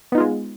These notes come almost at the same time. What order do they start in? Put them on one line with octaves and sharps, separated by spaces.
B3 D#4 F4 G#3